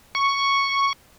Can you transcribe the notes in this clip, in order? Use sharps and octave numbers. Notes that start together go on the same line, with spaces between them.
C#6